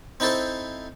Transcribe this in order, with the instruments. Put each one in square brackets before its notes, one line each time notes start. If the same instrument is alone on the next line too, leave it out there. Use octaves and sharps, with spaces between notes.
[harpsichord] C4 D#4 E4 A4 C5